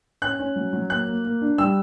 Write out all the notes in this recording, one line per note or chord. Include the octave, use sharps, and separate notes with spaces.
C#4 F#6
C#4
F#3
F#3
A#3 F#6
A#3
A#3
D4
G3 E6